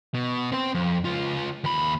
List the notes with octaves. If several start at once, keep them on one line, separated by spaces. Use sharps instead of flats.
B2
C4 C5
F2
C#2 F4
D#2 B5